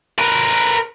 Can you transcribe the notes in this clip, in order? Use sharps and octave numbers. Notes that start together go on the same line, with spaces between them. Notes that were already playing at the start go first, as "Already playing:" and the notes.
A#4 B4